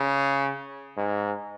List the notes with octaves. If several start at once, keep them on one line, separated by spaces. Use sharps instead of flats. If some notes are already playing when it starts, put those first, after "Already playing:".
Already playing: C#3
G#2